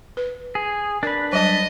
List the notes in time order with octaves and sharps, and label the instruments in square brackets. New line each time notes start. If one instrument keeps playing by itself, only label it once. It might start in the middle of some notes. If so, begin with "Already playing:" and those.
[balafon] B4
[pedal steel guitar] G#4
[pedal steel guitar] D4 B4 [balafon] A#4 D5
[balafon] F#3 G3 A5 [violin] D#5